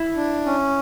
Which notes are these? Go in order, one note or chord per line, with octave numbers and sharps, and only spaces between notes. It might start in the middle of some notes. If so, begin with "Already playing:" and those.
Already playing: E4
D4
C#4